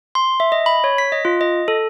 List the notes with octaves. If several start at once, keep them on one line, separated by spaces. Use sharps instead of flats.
C6
E5
D#5
B5
C#5
B6
D#5
F4
D#5
A4